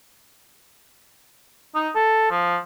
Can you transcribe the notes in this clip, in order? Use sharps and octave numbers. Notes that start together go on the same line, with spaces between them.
D#4
A4
F3